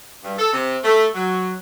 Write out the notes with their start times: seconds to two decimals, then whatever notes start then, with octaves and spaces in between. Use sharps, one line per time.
0.23 G2
0.38 A4
0.52 C3
0.84 A3
1.14 F#3